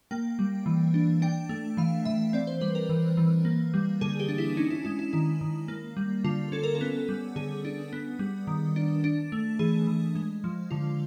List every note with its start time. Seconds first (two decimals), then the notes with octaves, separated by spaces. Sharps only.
0.11 A#3 G5
0.39 G3
0.66 E3
0.94 D4
1.22 D4 G5
1.49 A3
1.77 E3 F5
2.05 E3 E5
2.33 C4 D5
2.47 C5
2.61 G3 B4
2.75 A#4
2.89 E3
3.17 E3
3.45 A#3
3.74 G3
4.01 D3 G#4
4.20 G4
4.29 D4
4.38 E4
4.57 C#4 D#4
4.70 E4
4.85 G#3 E4
4.99 E4
5.13 D#3 E4
5.41 D#3
5.68 A#3
5.97 G3
6.24 D3 F4
6.52 C#4 A4
6.63 A#4
6.75 A4
6.81 B3
7.09 G3
7.36 D3 G#4
7.65 D4
7.93 B3
8.19 G3
8.47 D#3
8.76 D4
9.04 D4
9.32 A3
9.59 E3 G#4
9.87 E3
10.15 G#3
10.44 F3
10.71 D3 F4